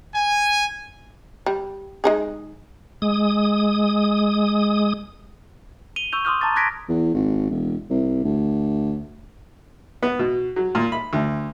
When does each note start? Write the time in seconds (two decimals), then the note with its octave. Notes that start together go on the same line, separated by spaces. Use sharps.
0.15 G#5
1.46 G3
2.04 G#3 D#4 G#4
3.02 G#3 D#6
5.96 D#7 F7 G7
6.12 C#6 E6 G6 F7
6.25 C6 D6 D#6 F6 G6
6.41 A5 A#5 D6 A6
6.56 D6 F#6 G#6 A#6 B6 D7
6.89 E2
7.14 G#1
7.50 E1
7.90 C2
8.24 D2
10.02 B3
10.19 B2
10.56 F#3
10.75 A#2
10.92 B5
11.13 D2